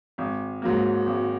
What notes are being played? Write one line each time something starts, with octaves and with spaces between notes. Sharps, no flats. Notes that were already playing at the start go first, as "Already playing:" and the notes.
G#1
G#2 F#3 A#3
G#1